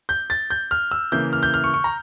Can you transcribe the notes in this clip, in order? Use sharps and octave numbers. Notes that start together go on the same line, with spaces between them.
G6
A6
G6
F6
E6
C#3 E3 A#3 E4 G6
F6
G6
F6
C#6
C#6
A#5